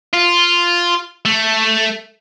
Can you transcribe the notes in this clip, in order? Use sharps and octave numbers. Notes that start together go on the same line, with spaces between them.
F4
A3